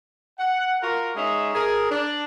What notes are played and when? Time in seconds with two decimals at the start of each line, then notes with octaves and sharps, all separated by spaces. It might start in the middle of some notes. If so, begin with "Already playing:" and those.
0.39 F#5
0.82 F4 F#4 A#4
1.15 G#3 C#4 D#4 G#4 E5
1.55 G#4 A#4
1.90 D4